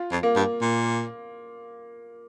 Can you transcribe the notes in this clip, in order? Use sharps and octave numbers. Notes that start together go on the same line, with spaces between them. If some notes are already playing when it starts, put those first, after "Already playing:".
Already playing: F4
F2
A#3
G2
A#2